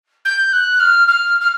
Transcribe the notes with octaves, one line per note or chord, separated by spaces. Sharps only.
G6
F#6
F6
F6
F6